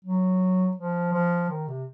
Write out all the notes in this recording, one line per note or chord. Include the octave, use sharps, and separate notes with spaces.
F#3
F3
F3
D#3
C3